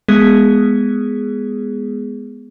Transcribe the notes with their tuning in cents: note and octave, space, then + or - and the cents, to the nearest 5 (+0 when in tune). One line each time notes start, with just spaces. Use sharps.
G#3 +0 B3 +0 G#4 +0